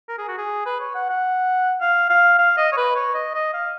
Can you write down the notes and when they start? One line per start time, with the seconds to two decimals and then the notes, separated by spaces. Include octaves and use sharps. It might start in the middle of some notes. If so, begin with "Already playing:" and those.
0.09 A#4
0.18 G#4
0.28 F#4
0.38 G#4
0.66 B4
0.80 C#5
0.95 F#5
1.09 F#5
1.81 F5
2.10 F5
2.39 F5
2.58 D#5
2.73 C#5
2.77 B4
2.96 C#5
3.15 D#5
3.34 D#5
3.54 F5